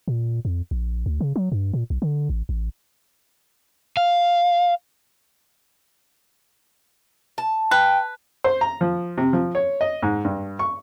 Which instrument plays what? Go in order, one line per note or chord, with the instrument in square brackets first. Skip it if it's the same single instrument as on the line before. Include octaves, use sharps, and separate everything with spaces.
[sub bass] A#2
F2
A#1
D2
C#3
F#3
G2
A#2
B1
D3
A1
A1
[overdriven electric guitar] F5
[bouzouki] A5
[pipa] B4 [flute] G5
[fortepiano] C5
A#5
F3
C3
F3
C#5
D#5
G#2
G2
C#6